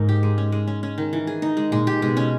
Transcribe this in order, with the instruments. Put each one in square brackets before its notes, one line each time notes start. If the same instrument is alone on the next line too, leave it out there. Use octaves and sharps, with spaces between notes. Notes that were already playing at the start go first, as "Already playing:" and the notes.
Already playing: [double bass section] G#2 [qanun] A#3 D#4 A#4
[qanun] G4
G#3
C#4
G#3
C#4
C#4
D#3
E3
G#4
D#4
G#3
[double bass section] A#2 [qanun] G#3
[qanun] G4
[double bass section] B2 [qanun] G#3
[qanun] C#4